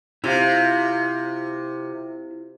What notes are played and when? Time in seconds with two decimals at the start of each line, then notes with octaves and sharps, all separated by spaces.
0.24 C3 E4 F4 F5